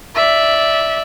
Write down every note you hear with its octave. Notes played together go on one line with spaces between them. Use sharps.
D5 E5